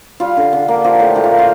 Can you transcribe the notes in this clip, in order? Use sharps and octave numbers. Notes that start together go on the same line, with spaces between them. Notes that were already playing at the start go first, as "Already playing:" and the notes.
G3 F4
D3
D3
A#3
F3 G4
A2 G4
A2 G4
F4
A#3
F4